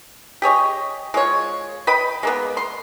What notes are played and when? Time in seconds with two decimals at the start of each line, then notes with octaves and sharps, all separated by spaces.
0.42 G4 G#4 C#5 D#5
1.14 G#3 F4 C#5
1.87 B4 D#5 G5 B5
2.23 G#3 A#3 B3
2.57 C6